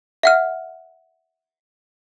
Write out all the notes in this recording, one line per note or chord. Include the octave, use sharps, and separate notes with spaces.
E5 F#5 F6